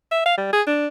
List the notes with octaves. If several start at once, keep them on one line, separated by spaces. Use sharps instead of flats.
E5
F5
G3
G#4
D4